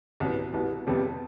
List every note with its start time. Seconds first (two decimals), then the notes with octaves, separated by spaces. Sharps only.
0.20 C2 B2 B3
0.53 C2 B2 B3
0.87 F2 C3 G3 B3